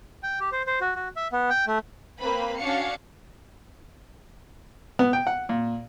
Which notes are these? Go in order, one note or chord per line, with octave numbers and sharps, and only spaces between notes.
G5
G4
C5
C5
F#4
F#4
E5
B3
G5
A3
A#3 C4 B4 B5
C#4 D4 F#4 F5 C#7
B3
G5
F#5
A#2